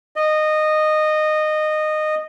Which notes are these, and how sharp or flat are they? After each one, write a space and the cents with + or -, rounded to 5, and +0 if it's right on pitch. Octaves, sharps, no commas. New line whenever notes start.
D#5 -15